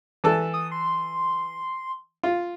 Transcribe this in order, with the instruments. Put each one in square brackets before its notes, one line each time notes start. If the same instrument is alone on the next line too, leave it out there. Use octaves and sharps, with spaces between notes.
[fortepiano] E3 A4 A5
[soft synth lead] D#6
C6
[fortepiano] F4